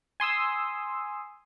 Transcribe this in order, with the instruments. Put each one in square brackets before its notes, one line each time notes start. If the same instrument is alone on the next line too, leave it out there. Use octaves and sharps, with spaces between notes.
[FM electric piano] G#5 C6 D#6 E6